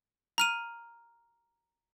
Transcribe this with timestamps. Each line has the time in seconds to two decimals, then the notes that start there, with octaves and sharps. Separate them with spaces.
0.38 A#5 F6 D#7